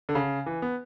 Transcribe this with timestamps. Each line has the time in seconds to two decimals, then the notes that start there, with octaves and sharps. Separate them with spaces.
0.09 D3
0.15 C#3
0.46 E3
0.62 B3